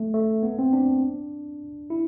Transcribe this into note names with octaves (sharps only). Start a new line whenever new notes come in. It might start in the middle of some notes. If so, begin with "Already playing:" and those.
Already playing: A3
A3
B3
C4
D4
E4